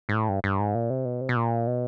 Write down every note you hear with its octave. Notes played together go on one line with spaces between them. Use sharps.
G#2
A2
G2
G2
G#2
A#2
C3
B2
C3
B2
A#2
B2